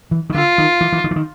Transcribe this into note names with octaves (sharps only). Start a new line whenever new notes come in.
E3
D#3
D3 F4
D#3
E3
E3
D#3
E3
D#3